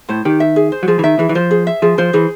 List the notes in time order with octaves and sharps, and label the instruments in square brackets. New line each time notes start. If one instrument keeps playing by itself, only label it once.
[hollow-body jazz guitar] A2 [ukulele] C5
[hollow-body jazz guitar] D#3 [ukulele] G4
[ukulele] E5
G#4
C5
[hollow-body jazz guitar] F#3
[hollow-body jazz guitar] F3 [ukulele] G#4
[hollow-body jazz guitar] E3
[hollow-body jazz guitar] D#3 [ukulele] E5
[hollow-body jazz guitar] E3 [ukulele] G#4
[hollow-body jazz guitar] E3
[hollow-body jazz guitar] F3 [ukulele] C5
[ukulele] G#4
E5
[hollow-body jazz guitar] F3 [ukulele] G#4
[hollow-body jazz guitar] F3 [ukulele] C5
[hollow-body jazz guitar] E3 [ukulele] G#4